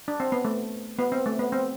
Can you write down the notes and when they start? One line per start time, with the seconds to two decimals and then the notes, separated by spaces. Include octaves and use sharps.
0.08 D4
0.20 C4
0.32 B3
0.45 A3
0.99 B3
1.12 C4
1.26 A3
1.39 B3
1.52 C4